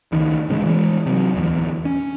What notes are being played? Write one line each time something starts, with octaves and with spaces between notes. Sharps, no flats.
C#2 D#3
A1 C#3 G#3
E3 G#3
C3 F#3
D1 E2
C#4